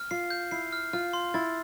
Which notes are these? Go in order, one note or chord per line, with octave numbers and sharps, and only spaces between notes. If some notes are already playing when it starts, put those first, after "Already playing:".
Already playing: F6
F4 C7
G6
E4 C7
F6
F4 F6
C6
E4 A6